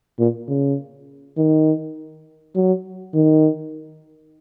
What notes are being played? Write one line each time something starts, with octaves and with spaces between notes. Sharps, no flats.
A#2
C#3
D#3
F#3
D#3